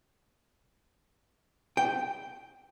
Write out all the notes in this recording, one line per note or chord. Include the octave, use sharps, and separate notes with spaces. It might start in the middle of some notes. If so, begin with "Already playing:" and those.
G5